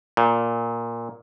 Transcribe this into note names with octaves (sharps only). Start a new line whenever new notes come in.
A#2